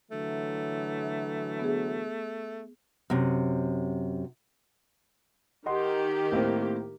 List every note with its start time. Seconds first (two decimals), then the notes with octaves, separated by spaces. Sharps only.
0.11 D3 E3 F#3 A3
1.59 B3 G#4
3.10 F#2 C3
5.66 D#3 G4 D#5 F#5 C6
6.32 A2 A#3 C4